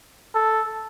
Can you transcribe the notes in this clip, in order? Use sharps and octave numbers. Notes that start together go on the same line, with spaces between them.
A4